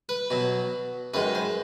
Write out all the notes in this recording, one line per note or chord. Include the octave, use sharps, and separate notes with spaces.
B4
B2 F#3
F#2 D#3 G#3 B4
C5